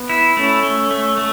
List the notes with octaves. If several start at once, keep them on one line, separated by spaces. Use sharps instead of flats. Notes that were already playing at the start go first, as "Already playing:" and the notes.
Already playing: B3
E4
A3 C#4
A3
A3
A3